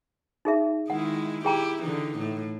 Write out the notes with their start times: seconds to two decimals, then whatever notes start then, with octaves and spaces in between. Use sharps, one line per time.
0.45 D#4 G#4 E5
0.90 D#3 G#3 E4 F#5
1.45 E4 G4 G#4 G5 A#5
1.82 D3 E3 D#4
2.19 A2